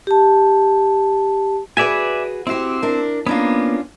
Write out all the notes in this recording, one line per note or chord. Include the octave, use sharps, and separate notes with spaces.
G4 A5
F#4 G#4 B4 D5 E5 G#5
C4 E4 F#4 G4 C5
D4 A#4
A#3 B3 C#4 D4 F4